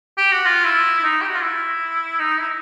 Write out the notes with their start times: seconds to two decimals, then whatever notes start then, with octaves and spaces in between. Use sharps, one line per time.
0.18 G4
0.32 F#4
0.46 F4
0.65 E4
0.99 E4
1.04 D#4
1.21 G4
1.28 F#4
1.35 F4
1.42 E4
2.19 D#4
2.39 E4